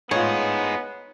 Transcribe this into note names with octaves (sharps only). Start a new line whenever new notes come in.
A2 B3 D#4 F4 G#4 C#5